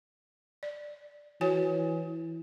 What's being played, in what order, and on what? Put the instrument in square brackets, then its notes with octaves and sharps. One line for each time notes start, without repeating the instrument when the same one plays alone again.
[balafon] D5
[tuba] E3 [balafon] F#4 C#5 G#5